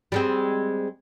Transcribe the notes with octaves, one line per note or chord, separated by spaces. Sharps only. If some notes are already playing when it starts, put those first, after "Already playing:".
G3 G#3 C4